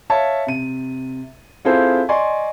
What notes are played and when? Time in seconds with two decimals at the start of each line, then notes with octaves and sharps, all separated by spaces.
0.10 C#5 E5 F5 A5
0.47 C3 D#7
1.65 C4 E4 F4 G#4 A4 C5
2.09 D5 D#5 G#5 C6 C#6